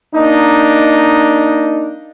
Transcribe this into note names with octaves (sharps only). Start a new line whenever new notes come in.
A#3 D4 D#4